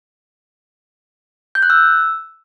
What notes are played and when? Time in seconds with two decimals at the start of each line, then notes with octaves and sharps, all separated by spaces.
1.55 G6
1.63 F#6
1.70 E6